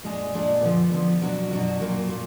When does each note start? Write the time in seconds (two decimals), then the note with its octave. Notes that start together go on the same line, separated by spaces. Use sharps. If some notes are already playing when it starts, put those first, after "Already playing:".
0.04 A#2 G#3 D4 G#4
0.34 A#2 G#3 D4 G#4
0.62 D3 F3 B3
0.92 D3 F3 B3
1.22 B2 F#3 D4 F#4
1.51 B2 F#3 D4 F#4
1.80 A#2 F#3 A#3
2.10 A#2